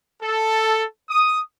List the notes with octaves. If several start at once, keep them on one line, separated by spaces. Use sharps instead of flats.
A4
D#6